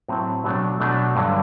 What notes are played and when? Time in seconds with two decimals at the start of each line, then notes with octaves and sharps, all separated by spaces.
0.08 A2 F#3 C4
0.44 B2 F#3 A3 D4
0.80 B2 F#3 A3 D4
1.16 G2 D3 F#3